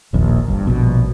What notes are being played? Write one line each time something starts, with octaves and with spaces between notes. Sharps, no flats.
D#1 A#1 D#2
G1 G2
A#1 B2